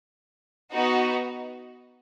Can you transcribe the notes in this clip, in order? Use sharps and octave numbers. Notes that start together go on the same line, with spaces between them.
B3 D#4 F#4